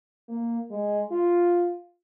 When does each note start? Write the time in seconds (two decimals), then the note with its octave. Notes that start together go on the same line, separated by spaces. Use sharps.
0.29 A#3
0.71 G#3
1.11 F4